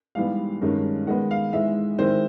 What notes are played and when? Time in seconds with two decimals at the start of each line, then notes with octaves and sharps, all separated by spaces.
0.15 G#2 E3 G3 B3 F5
0.62 G2 D#3 G#3 C#4
1.07 D#3 G#3 B3 F#5
1.31 F5
1.52 G#2 E3 G#3 E5
1.98 D#3 G#3 C4 E4 C5